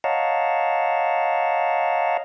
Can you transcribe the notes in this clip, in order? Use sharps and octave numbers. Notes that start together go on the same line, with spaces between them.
C#5 D#5 F5 F#5 A5 A#5